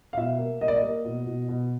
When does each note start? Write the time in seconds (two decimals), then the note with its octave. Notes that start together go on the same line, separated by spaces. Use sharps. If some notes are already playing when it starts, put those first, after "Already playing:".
0.13 F5
0.17 B2 E5
0.39 A#3
0.61 A#3 D#5
0.68 D5
0.76 D#5
0.83 A#3
1.05 B2
1.27 B2
1.49 B2